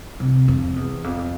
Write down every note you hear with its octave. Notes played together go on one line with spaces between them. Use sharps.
C3
F2
E2
F2